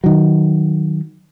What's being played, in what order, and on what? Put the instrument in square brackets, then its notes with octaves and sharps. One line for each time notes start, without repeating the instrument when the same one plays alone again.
[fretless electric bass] D#3 F#3